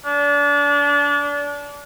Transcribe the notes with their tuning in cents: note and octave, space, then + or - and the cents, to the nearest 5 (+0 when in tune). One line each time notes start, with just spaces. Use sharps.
D4 -30